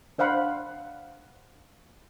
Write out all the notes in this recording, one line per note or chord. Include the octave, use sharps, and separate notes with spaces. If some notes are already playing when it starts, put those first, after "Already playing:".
D4 C5 F5 F#5 B5 C6